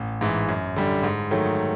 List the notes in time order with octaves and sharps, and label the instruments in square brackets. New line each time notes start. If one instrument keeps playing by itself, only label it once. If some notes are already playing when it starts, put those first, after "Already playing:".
Already playing: [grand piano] A1
G#2 E3
F#2
D3 G3
G#2
D#3 F#3 A3